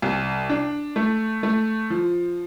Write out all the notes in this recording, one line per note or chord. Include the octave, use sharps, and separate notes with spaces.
C2
D4
A3
A3
F3